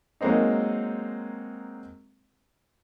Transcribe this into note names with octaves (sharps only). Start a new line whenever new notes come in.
F#3 G#3 A#3 C4 D#4